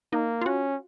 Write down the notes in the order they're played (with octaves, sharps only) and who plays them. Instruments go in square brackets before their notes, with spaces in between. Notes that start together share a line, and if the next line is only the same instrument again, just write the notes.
[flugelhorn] A#3 [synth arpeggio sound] D#4
[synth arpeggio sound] F4
[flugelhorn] C#4 [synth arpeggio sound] F#4